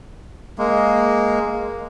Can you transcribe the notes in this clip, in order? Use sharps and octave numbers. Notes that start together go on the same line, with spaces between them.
G#3 A#3